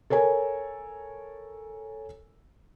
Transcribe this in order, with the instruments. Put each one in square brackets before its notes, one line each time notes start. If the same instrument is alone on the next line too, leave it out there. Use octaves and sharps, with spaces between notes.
[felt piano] A4 A#4 C#5 G#5